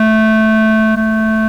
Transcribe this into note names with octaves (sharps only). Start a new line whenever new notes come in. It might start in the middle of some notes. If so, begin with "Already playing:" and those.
Already playing: A3
A3